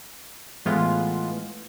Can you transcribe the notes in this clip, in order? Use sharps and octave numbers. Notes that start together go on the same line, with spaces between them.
A2 E3 G#3 B3 F4